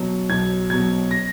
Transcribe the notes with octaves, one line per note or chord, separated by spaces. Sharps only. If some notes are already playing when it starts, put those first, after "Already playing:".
Already playing: B1 B2 F#3
B1 G#6
B2 F#3 G#6
A#6